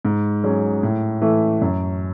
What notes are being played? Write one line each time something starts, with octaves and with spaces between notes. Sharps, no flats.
G#2
F#3 C#4 G#4
A2
E3 A3
F#2